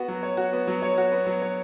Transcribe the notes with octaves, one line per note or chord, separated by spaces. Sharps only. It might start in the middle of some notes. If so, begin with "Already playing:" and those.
Already playing: B3 F#4
F#3
C#5
F#4
B3
F#3
C#5
F#4
B3
F#3
C#5